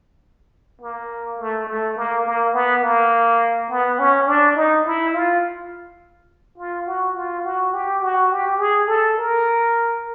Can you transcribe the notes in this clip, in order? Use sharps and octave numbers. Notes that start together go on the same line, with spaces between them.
A#3
A3
A3
A#3
A#3
B3
A#3
B3
C#4
D4
D#4
E4
F4
F4
F#4
F4
F#4
G4
F#4
G4
G#4
A4
A#4